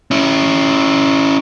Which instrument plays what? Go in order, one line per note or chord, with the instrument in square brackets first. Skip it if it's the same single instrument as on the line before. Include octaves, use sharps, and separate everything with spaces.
[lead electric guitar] C#4 E4